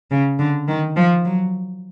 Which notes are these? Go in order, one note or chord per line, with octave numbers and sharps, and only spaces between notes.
C#3
D3
D#3
F3
F#3